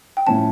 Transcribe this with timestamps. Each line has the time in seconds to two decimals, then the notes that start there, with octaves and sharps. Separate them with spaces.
0.17 G5
0.27 A2 F3 C#4 A5